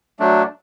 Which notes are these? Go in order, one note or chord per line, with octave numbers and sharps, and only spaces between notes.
F#3 A3 D4